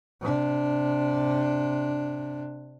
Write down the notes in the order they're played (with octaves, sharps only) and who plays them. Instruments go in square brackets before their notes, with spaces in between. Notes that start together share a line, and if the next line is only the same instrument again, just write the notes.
[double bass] C3 D4